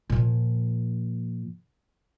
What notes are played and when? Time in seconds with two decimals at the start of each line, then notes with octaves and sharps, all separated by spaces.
0.10 A#2 F3